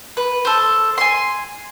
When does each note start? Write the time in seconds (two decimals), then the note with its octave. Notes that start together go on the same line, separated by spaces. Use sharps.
0.17 B4
0.45 A4 C5
0.98 G#5 C6